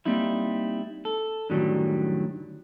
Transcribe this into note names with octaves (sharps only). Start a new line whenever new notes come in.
G3 A#3 C4 D#4 E4
A4
F#2 A2 D3 D#3 F#3 G3